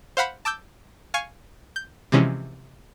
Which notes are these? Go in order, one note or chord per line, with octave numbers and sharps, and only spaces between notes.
C5 F5 F#5 B5
A5 D6 E6 G6
F5 G#5 C#6 G#6
G6
C3 E3 F3 G#3 C#4